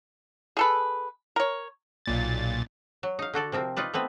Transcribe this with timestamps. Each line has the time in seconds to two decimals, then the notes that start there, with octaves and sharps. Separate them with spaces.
0.57 G#4 A4 B4
1.36 A#4 C#5
2.06 B1 A#2 A6
3.03 F#3
3.19 D#4 F5
3.34 D3 F#4 A4 D5
3.52 C3 F3 C4 A#4
3.76 D#4 F4 B4 D5
3.94 A3 B3 C4 B4